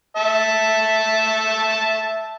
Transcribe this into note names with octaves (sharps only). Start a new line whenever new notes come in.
E5 A5